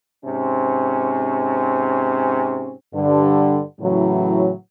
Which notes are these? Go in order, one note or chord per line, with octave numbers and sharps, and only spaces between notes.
G#2 C3 C4 C#4
G2 D3
A2 C#3 E3 F#3